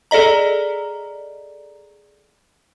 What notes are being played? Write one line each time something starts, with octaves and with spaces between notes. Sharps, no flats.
G#4 A4 D5 D#5 A#5